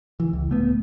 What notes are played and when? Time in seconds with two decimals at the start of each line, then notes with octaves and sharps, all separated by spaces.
0.20 E3
0.33 C#2
0.50 D1 A3 B3